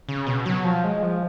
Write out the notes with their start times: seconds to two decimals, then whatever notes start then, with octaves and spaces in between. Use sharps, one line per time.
0.09 C#3
0.27 B2
0.46 F#3
0.64 F3
0.84 G#3
1.03 F3